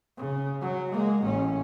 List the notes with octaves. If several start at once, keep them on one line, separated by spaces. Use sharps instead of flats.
C#3
F#3
G#3 A#3
A1 C#4